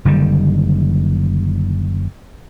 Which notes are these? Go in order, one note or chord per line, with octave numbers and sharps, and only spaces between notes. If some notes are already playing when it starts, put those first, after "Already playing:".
F#1 D3 D#3 G3